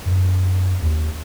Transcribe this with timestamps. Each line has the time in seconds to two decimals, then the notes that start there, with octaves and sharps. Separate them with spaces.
0.06 F#2
0.82 D#2